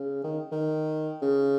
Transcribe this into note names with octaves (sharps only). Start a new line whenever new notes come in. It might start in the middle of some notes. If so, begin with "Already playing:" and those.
Already playing: C#3
D#3
D#3
C#3